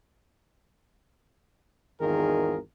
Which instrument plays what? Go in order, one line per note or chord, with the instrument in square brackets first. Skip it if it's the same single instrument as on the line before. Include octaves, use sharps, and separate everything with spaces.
[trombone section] G#1 E2 D#3 F4 G#4 A#4